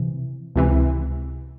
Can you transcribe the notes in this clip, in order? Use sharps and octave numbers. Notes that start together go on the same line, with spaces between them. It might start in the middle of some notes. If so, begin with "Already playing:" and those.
Already playing: C3 E3
C#2 C3 E3